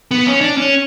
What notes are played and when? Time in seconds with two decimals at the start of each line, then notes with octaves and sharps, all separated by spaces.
0.11 B3
0.27 C#4
0.41 D4
0.57 C#4